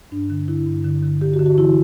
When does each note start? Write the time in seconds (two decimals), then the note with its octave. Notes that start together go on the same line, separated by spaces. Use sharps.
0.11 G2 D4
0.30 D3
0.48 D3 E4
0.67 G2
0.84 D3
1.03 D3
1.21 D3 G4
1.34 F#4
1.39 D3
1.46 F#4
1.58 E3 E4